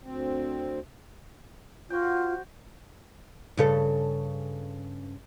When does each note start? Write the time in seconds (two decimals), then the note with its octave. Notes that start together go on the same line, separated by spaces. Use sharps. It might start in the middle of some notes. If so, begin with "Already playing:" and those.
0.03 D2 C4
1.90 F4 F#4 C5 G5
3.57 G2 C#3 A4